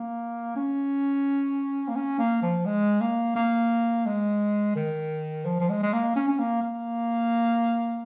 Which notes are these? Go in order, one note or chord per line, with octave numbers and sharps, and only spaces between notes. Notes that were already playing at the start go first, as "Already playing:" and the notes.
Already playing: A#3
C#4
A#3
C#4
A#3
F3
G#3
A#3
A#3
G#3
D#3
F3
F3
G#3
G#3
A#3
C#4
C#4
A#3
A#3